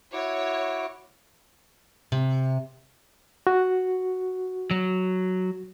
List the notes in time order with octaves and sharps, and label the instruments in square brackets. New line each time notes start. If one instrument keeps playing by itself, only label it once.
[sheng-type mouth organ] E4 F#4 D6 [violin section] C#5
[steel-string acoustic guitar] C3
[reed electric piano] F#4
[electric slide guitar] F#3